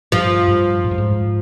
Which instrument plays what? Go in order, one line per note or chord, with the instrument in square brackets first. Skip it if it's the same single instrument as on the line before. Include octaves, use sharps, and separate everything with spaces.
[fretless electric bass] G2 [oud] F3
[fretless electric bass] G2
G#2
G2
G#2